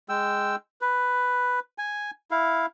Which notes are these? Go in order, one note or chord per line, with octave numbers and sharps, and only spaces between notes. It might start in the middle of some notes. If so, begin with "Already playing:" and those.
G#3 G5 E6
B4
G#5
E4 F5